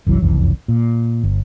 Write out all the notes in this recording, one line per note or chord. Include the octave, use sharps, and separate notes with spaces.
F#1 C2 E3 F#3
F#1 C2 F2 E3
A#2
G1